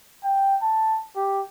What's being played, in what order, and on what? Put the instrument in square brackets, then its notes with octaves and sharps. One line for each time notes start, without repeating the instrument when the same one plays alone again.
[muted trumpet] G5
A5
G4